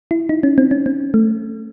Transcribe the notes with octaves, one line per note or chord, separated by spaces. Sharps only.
E4
D#4
C#4
C4
C#4
C4
A3